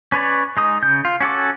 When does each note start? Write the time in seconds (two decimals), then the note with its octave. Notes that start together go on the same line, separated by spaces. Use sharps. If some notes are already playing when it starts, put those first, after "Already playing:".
0.12 C#4 B4 C#5 D5
0.57 G#3 D#4 D#6
0.82 C#3 G6
1.05 F4
1.21 C#4 F#4 A4 D6